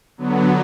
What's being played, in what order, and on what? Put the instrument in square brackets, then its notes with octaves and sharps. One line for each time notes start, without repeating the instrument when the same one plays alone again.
[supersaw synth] D3 F#3 B3